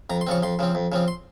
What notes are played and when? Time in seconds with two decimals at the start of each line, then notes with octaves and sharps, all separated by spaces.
0.10 F2 A#5
0.21 C6
0.27 C#3 F3 C4 C#6
0.43 F2 C6
0.59 C#3 F3 C4
0.75 F2
0.92 C#3 F3 C4
1.08 C6